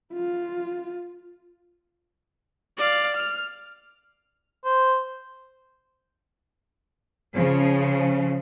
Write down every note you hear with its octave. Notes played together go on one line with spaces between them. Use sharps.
F4
D5 F5
F6
C5
C#3 F3